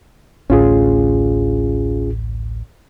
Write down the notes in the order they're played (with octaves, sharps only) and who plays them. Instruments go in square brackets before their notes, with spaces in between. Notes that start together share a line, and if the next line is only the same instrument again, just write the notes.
[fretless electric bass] A1 D2 A2 [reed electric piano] C#4 F4 G#4